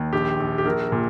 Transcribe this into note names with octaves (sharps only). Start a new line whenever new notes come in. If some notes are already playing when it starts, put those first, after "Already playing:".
Already playing: D#2
A#1 G4
A#1
G4
A#1 A#4
A#2